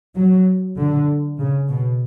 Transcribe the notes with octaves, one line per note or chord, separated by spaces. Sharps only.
F#3
D3
C#3
B2